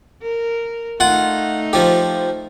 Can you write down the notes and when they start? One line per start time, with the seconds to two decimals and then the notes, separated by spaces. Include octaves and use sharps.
0.23 A#4
1.00 A3 D#4 F4 F#5
1.73 F3 G4